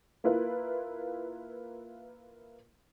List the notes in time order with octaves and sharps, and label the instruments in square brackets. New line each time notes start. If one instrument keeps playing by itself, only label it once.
[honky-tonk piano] A#3 E4 F4 B4